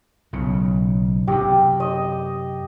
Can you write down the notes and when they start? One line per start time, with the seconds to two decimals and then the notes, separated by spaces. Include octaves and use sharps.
0.33 B1 C#3
1.27 F#2 C3 G4
1.80 D#5